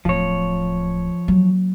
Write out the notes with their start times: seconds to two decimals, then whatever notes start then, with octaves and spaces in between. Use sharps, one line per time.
0.05 D1 F3 C#5
1.28 F#3 A#3